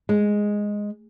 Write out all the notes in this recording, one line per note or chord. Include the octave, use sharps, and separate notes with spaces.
G#3